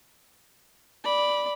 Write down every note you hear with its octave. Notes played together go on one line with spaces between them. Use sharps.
D5 B5